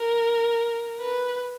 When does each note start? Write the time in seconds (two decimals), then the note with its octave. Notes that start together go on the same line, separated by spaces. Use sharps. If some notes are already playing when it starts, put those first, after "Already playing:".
Already playing: A#4
1.00 B4